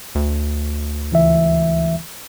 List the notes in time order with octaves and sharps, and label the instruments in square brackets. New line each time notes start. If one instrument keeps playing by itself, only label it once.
[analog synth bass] D2
[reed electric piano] C#2 E3 E5